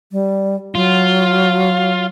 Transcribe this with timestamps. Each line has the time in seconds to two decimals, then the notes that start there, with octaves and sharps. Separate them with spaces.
0.12 G3
0.75 F#3 F4